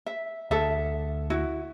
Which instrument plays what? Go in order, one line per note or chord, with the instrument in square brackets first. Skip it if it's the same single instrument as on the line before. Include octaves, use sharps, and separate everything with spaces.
[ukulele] E5
[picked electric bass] D2 [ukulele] A4 E5
[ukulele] E4 F#4